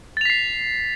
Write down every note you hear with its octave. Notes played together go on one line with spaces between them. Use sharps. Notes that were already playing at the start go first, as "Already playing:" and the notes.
A6 B6 C7 F7